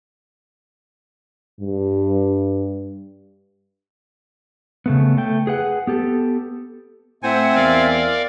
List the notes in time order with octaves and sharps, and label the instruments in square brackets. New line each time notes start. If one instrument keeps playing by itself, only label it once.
[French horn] G2
[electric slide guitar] C#3 A3 B3
A3 G5
G#4 B4 F#5
B3 G4 A4
[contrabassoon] A2 [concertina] C4 G#5 [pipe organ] C5 F#5 [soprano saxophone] E5
[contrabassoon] E2 [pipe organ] A#4 D5 F5